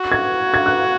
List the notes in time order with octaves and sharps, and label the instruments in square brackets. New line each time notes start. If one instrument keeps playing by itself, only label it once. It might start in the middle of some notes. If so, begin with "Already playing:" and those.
Already playing: [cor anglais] F#4
[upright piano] G#6
G#6
F#6